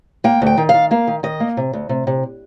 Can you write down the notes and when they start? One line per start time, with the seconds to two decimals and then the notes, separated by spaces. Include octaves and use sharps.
0.24 A#3 G5
0.42 D2 G5
0.57 D#3
0.69 D#3 F5
0.91 A#3 F5
1.07 D#3
1.23 D#3 D#5
1.40 A#3
1.57 C3
1.73 D2
1.89 C3
2.07 C3